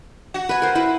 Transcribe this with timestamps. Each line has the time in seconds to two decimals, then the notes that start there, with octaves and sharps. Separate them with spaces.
0.34 F#4
0.49 B4 G#5
0.62 A#4 C5
0.75 E4 B4